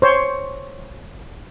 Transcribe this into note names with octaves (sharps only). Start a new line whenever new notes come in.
C5 C#5